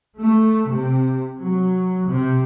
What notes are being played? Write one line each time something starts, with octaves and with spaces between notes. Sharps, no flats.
A3
C3
F#3
C3